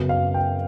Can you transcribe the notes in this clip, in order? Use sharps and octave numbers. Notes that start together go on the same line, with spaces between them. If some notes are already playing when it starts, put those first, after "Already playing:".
Already playing: F#2 C#3 F#3 B3
F5
G5